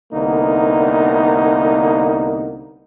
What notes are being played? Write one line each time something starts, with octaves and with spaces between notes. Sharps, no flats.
C2 D3 A#3 B3 D#4